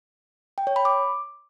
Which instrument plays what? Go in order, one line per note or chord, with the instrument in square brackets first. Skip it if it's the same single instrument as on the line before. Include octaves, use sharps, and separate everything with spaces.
[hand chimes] G5
C#5
B5
D6